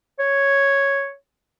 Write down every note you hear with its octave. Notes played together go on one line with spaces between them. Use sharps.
C#5